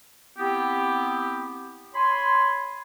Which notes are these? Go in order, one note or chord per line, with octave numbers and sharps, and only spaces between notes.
B3 C4 E4 G4
C#5 G#5 B5 C6